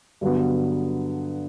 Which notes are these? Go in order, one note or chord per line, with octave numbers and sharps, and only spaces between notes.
G2 D3 F#3 B3